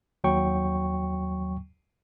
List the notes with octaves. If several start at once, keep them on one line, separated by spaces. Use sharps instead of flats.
D#2 F#3 G5 C#6